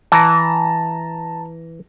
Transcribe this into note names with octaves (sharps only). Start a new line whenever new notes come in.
E3 A5 A#5 A#6